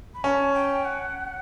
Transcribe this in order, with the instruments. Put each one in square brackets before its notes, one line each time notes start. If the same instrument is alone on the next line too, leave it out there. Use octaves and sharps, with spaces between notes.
[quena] B5
[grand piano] C#4 [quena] A5
[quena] G5
F#5